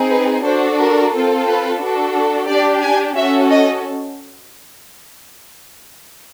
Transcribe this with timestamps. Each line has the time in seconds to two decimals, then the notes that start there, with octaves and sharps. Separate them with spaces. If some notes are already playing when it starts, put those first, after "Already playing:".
Already playing: C4 D#4 G#4
0.10 B4
0.44 D4 F#4 A4 C5
0.79 A#4
1.13 C4 F4 A4
1.46 B4
1.81 D4 F#4 A4
2.48 D4 G4 D5
2.83 G#5
3.16 C#4 F#4 A4 E5
3.50 D#5